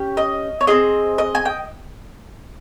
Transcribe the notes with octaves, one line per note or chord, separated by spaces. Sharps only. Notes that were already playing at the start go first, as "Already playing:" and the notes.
Already playing: C#4 G4
D#5
C#5
C4 F4 G#4 D#5
D#5
G#5
G5